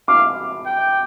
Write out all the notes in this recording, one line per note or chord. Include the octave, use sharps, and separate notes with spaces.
F5 D6
G5